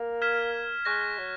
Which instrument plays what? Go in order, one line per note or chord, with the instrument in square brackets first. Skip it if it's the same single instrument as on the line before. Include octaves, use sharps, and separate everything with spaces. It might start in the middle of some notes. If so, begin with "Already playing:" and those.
Already playing: [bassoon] A#3
[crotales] F6 G#6 B6 E7
[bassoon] G#3 [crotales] C#6 F#6 A#6
[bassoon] F#3